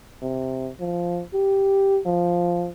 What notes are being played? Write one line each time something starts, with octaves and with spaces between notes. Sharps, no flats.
C3
F3
G4
F3